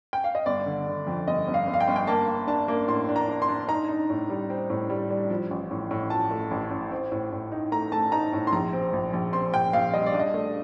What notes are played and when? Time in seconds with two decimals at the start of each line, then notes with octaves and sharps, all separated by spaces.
0.13 G5
0.24 F5
0.35 D#5
0.46 G1 D5
0.66 D3
0.87 D3
1.07 F2
1.27 G1 D#5
1.48 G1
1.54 F5
1.67 G1
1.74 F5
1.80 G5
1.88 G1
1.96 G5
2.07 A#3 A5
2.28 A#3
2.47 D4 A5
2.68 A#3
2.88 A2 C6
3.09 D4
3.16 A#5
3.28 D4
3.42 C6
3.49 D4
3.68 D#4 A#5
3.89 D#4
4.10 A2
4.30 G3
4.50 C4
4.70 A2
4.90 G3
5.10 G3
5.30 F3
5.51 A1
5.71 A2
5.91 A2
6.10 F3 A5
6.31 A3
6.51 A1
6.71 A2
6.91 C4
7.12 A2
7.32 A2
7.52 D#4
7.72 A3 A#5
7.92 A3 A5
8.12 D#4 A#5
8.33 A2
8.47 C6
8.52 A#1 A#5
8.73 C4
8.93 A#1
9.13 A#1
9.33 C4 C6
9.54 A#1 G5
9.73 A#1 F5
9.94 G3 D#5
10.06 D5
10.14 D4
10.19 D#5
10.34 A3